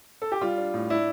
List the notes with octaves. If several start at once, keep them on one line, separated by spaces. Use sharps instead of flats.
A4
G4
G3 F4
D4
A2
D4 E4